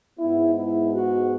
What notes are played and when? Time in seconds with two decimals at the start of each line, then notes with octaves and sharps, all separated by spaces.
0.19 G#2 G#3 B3 E4
0.56 E4
0.94 F#4